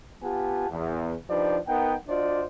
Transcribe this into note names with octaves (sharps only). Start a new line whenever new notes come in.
B3 F4 G4 F#5 G#5 A5
E2
F3 D4 D#4 G4 B4 D5
B3 D#4 A#4 F#5 G5
D4 F4 F#4 C5 D5 D#5